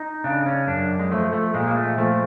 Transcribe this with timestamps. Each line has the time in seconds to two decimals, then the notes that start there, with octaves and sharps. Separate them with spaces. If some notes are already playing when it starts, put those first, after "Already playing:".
Already playing: D#4
0.24 C#3 D4
0.46 C#4
0.67 F#2 D4
0.99 G#3
1.11 F3 A3
1.33 A3
1.54 A#2 G#3
1.67 A#3
1.76 A3
1.97 F3 A3